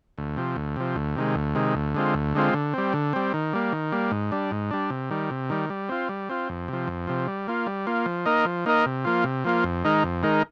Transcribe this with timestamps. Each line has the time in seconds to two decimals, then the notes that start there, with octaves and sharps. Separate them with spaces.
0.18 D2
0.37 C3 F3
0.56 D2
0.76 C3 F3
0.96 D2
1.16 C3 D#3 G#3
1.35 D2
1.55 C3 D#3 G#3
1.75 D2
1.95 D3 G#3 C4 F4
2.14 D2
2.35 D3 G#3 C4 F4
2.54 D3
2.73 G3 C4
2.93 D3
3.13 G3 C4
3.34 D#3
3.53 G3 A#3
3.72 D#3
3.92 G3 A#3
4.11 G#2
4.32 G3 D4
4.51 G#2
4.71 G3 D4
4.90 C3
5.11 D#3 G3
5.31 C3
5.50 D#3 G3
5.70 G3
5.89 C4 F4
6.09 G3
6.29 C4 F4
6.49 F2
6.68 C3 F3
6.87 F2
7.07 C3 F3
7.28 G3
7.48 A#3 F4
7.66 G3
7.87 A#3 F4
8.06 F3
8.26 A#3 D#4 A#4 D#5
8.45 F3
8.66 A#3 D#4 A#4 D#5
8.86 C3
9.04 F3 A#3 F4
9.24 C3
9.44 F3 A#3 F4
9.64 F2
9.84 D#3 G#3 D#4 A#4
10.04 F2
10.23 D#3 G#3 D#4 A#4